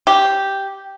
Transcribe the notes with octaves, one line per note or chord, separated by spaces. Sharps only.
G4